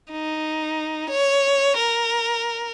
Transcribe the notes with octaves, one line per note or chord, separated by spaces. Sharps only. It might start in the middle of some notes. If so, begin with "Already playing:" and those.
D#4
C#5
A#4